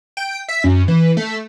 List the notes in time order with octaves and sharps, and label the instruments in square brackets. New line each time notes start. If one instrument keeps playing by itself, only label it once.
[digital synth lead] G5
E5
F#2
E3
A3